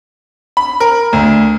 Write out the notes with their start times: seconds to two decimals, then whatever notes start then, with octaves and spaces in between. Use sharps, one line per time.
0.57 B5
0.80 A#4
1.13 D2